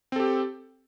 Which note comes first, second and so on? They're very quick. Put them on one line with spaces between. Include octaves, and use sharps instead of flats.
C4 A4 G4